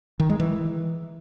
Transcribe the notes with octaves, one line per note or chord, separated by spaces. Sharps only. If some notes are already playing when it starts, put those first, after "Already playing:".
D#3
G#3
E3